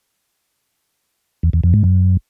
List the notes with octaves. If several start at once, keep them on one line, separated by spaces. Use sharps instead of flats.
E2
E2
F2
G#2
F#2